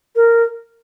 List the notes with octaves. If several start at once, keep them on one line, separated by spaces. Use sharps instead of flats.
A#4